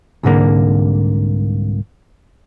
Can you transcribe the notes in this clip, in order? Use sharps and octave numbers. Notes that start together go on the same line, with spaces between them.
C2 G#2 D3 A#3